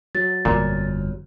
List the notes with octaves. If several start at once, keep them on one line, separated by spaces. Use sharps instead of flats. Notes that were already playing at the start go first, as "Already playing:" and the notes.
F#3 A6
G1 F2 A#2